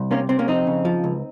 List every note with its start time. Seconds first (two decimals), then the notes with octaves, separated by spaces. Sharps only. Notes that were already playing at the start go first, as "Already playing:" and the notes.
Already playing: C2
0.11 C3 A#3 C#4
0.29 C3 C4
0.39 A#3 C#4
0.48 F2 C4 D#4
0.67 C#3
0.85 F3
1.04 C#2